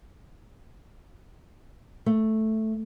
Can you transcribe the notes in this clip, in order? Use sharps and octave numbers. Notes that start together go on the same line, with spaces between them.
A3